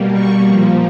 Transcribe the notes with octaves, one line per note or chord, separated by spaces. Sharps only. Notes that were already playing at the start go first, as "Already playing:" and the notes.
Already playing: B2 G3 A#3
C#6
A#2 F3 A#3